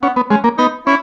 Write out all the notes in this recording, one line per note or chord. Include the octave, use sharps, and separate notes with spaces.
B3 C#4
B3
G#3 C#4
A#3
B3 D#4
C#4 E4